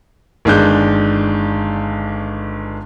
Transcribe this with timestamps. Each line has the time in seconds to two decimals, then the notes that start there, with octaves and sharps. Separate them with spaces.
0.45 G1 D#3 G#3 D4 F#6 G6